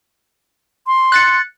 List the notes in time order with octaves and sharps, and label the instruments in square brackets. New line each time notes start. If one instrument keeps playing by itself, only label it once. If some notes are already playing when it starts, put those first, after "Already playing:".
[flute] C6
[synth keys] F#6 A6 C#7